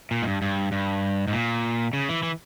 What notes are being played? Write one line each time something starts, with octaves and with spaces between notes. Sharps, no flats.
A#2
G#2
G2
G2
G2
G#2
A#2
C#3
E3
E3